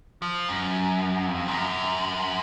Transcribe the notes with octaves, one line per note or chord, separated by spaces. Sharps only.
F3
F#2
F2
G#2
F#2